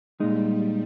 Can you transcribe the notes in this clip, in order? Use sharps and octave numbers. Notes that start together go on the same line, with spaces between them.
A#2 G3 G#3 D#4